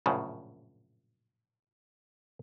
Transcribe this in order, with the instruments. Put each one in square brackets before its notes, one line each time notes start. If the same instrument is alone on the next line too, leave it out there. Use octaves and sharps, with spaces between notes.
[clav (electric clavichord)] A#1 F#2 A2 C#3